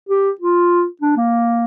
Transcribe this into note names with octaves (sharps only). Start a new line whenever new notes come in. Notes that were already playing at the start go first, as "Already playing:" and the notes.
G4
F4
D4
A#3